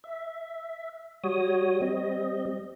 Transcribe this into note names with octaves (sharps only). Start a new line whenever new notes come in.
E5
G3 F#4 C#5 D#6
G3 C4 D#5